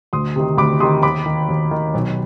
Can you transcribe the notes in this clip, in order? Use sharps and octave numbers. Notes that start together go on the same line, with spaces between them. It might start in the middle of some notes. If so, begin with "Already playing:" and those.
D2 C6 D#6
C3 D#3
D2 B5 D6
C3 D#3 C6 D#6
D#2 B5 D6
D#3
D#2
D#3
B1